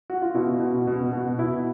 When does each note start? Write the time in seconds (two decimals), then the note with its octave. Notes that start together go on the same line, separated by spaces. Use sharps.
0.10 F#4
0.22 F4
0.34 B2 E4
0.60 B2
0.87 B2
1.12 B2 F#4
1.39 B2 E4